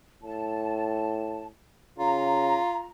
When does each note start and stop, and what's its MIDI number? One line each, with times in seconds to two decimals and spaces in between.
0.23 1.50 45
0.23 1.44 81
1.98 2.61 49
1.98 2.89 65
1.98 2.87 82